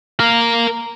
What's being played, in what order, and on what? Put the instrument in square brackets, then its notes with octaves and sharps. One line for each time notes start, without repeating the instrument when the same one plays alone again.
[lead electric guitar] A#4 F5